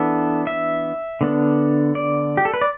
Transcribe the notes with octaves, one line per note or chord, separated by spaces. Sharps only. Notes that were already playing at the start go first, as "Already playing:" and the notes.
Already playing: E3 B3 D4 A4
E5
D3 B3 D4
D5
G4
A4
B4
D5